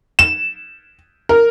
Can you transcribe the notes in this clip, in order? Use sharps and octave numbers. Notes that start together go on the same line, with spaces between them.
E7
A#4